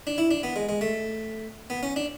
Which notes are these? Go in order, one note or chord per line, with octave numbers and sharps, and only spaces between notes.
D4
E4
D4
B3
G#3
G#3
A3
B3
C#4
D4